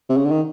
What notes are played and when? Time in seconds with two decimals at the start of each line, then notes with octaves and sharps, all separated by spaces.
0.09 C3
0.17 C#3
0.25 D3
0.31 D#3